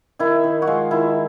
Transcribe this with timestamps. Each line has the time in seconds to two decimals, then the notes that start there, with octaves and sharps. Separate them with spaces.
0.19 D#3 E4
0.44 D#3
0.62 F#4
0.67 G#3 F4
0.91 D#3 E4